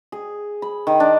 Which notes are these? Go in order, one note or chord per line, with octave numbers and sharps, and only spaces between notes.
G#4
B5
D#3
D4